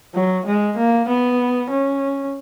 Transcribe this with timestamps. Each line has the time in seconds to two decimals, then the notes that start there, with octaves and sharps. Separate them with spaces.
0.15 F#3
0.46 G#3
0.77 A#3
1.08 B3
1.70 C#4